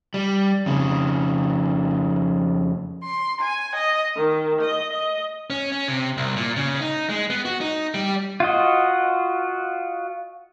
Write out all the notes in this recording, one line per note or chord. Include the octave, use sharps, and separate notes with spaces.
G3
F2 C#3
C6
G#5
D#5
D#3
D#5
D#5
C#4
C#4
C3
C2
A#2
C#3
D#4
G#3
B3
F#4
D#4
G3
F4 F#4 D#5